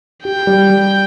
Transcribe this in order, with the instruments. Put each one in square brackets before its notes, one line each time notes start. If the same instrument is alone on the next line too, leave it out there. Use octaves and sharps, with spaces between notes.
[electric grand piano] G4 [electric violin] G5
[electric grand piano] G3
G3